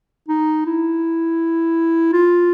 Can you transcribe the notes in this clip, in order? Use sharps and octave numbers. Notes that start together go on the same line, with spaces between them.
D#4
E4
F4